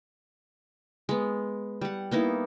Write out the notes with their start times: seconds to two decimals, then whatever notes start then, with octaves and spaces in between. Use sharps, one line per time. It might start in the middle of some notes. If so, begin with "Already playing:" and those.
1.09 G#3 B3
1.81 G3 F#5
2.11 A#3 B3 D#4 E4